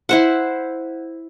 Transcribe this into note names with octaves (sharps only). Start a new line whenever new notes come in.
E4 C5 F#5